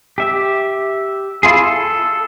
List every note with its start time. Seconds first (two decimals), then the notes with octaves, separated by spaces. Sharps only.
0.18 G4 E5
1.43 E4 F4 G#4
1.63 A4